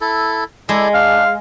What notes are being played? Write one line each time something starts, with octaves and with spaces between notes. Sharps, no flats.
E4 A4
G#3 E4 A4 D5
D4 F5